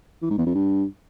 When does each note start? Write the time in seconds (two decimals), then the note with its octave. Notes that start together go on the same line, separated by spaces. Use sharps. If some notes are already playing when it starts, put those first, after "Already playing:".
0.22 E3
0.30 G#2
0.38 E2
0.47 F2
0.55 G2